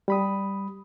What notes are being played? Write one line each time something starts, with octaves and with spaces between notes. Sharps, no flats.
G3 B5 D#6